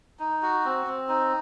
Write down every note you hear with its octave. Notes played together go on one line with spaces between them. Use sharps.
D#4
F#4
C4
C4
D#4